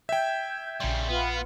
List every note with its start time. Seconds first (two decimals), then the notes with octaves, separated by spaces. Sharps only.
0.09 E5 G5 G6 G#6
0.80 A#1 C#3 G3 C6
1.09 B3 F4 B4 F#5